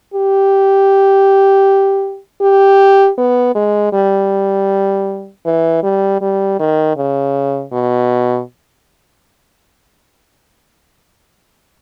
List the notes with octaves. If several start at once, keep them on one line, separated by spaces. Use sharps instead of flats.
G4
G4
B3
G#3
G3
E3
G3
G3
D#3
C#3
B2